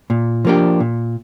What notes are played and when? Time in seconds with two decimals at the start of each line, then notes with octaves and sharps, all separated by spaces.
0.10 A#2
0.45 F3 A#3 D4 G4
0.80 A#2